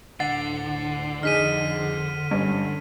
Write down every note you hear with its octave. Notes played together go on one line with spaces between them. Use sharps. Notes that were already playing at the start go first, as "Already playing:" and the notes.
D2 A2 D3 F#5 A6 C7
F2 D#4 G#4 F6 B6 D#7
G2 C#4